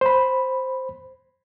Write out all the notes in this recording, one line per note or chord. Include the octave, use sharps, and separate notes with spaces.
C5 B5